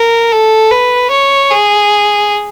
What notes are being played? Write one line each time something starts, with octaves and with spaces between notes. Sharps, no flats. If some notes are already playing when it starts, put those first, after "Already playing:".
Already playing: A#4
A4
B4
C#5
G#4